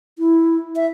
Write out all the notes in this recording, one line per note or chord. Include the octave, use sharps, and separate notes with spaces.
E4
E5